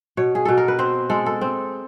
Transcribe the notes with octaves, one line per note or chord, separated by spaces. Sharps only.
B2 C#5
G#4
B2 A4
A#4
B4
C4 C5
G#3 A4
A4
C4